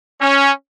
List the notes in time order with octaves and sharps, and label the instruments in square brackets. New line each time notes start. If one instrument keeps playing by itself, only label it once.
[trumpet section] C#4